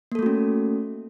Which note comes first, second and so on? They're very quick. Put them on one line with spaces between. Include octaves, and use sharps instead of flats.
A#3 A4 A3 F#4 C#4